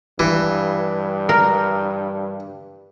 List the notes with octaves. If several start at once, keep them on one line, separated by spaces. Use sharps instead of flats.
G2 E3
A#4